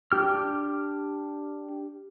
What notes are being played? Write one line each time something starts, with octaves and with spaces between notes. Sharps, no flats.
D4 G4 F6